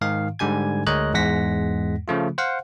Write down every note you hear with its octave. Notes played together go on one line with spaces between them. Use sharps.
G#2 D#3 F5
G#2 D3 G3 G#5 G#6
D2 G#3 A#4 C#5 D#5 F#6
E2 G#2 G#3 F#5 A#6 B6
C#3 F3 A3 F4
C5 F5 F#5